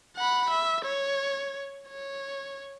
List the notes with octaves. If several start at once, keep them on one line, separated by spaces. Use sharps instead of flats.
F#5 B5
E5
C#5
C#5